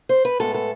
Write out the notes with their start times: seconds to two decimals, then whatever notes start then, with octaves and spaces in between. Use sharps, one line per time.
0.09 C5
0.25 B4
0.40 A2 G#3 B3 A4
0.54 A4